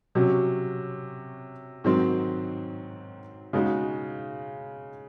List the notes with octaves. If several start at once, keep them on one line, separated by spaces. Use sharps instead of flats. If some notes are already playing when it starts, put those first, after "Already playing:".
C3 F#3 C#4 F#4
G#2 D#3 F#3 C4
C#3 G#3 D#4 F#4